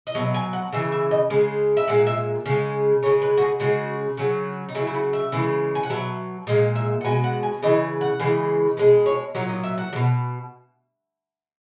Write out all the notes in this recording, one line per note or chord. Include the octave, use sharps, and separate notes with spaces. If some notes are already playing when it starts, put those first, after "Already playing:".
D#5
B2 F#3 E5
G#5
F#5
C#3 E3 E5
E5
D#5
C#3 G#3
E5
A#2 G#3 F#5
E5
C#3 G#3
C#3 G#3 C#5
B4
F#4
G#4
C#3 G#3 F#4
C#3 F#3
D#4
C#3 F#3 E4
E4
F#4
E5
C#3 E3 G#3
G#5
F#5
B2 F#3 E5
A#2 G#3 D#5
E5
F#5
B2 G#3 G#5
F#5
G#5
C#3 E3 D#5
F#5
C#3 E3 G#3
B2 G#3
C#5
A#2 F#3 C#5
D#5
E5
F#5
F#3
B2